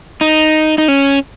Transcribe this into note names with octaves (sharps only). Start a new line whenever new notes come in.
D#4
D#4
C#4